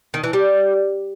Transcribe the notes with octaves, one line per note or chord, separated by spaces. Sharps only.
D#3
E3
G3